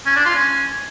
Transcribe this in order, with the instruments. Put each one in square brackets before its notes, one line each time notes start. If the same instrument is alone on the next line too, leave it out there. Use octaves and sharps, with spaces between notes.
[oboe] C#4
D4
F4
C#4